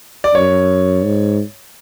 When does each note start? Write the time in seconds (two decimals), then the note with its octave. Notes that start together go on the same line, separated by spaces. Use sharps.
0.24 D5
0.34 F#2 C#5
1.04 G#2